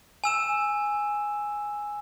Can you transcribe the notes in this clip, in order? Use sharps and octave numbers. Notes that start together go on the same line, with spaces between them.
G#5 E6 E7